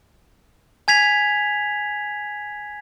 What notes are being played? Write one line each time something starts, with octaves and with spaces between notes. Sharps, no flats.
G#5 G#6 B6 F7